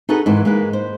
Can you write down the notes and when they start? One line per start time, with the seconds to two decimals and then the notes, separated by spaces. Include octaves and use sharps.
0.09 D#4 F#4 G#4 A4 B4
0.26 G#2 D#3 E3 E4
0.45 G#3 A#3 B4
0.73 C5